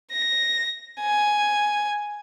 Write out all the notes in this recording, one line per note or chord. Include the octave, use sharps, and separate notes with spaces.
A#6
G#5